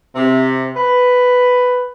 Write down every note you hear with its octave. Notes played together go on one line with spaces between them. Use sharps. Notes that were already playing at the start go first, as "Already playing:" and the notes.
C3
B4